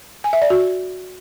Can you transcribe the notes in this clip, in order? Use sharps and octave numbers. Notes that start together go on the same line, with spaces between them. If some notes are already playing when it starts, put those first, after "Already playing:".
G#5
E5
D5
F#4